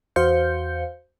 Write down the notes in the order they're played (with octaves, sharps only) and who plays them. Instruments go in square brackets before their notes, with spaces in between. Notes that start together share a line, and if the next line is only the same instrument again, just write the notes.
[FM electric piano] E2 F#4 C5 F5 G6 C#7